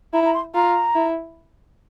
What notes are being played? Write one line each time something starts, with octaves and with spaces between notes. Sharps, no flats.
E4 A#5
A#5
C6
F4 A#5
E4